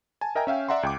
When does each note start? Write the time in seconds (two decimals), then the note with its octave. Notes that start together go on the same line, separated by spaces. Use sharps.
0.21 G#5 A5
0.35 A#4 D#5 E5 G5 G#5 A#5
0.47 C#4 E5 F5 G5
0.68 D5 E5 F#5 A#5 C6
0.83 C#2 G5 D6